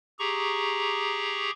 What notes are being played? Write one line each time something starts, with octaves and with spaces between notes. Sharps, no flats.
G4 G#4 A#5 C#6